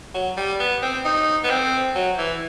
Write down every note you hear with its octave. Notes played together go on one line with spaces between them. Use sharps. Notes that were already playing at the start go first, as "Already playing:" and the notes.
F#3
G3
B3
C4
D#4
B3
C4
F#3
E3